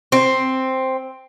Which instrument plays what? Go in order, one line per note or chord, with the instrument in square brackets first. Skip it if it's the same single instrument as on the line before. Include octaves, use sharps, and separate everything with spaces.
[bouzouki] C4